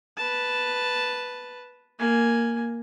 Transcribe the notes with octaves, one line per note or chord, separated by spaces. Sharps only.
B4 A5
A#3 G#5